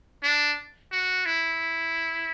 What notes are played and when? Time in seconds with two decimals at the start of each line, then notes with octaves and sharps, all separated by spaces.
0.23 D4
0.92 F#4
1.26 E4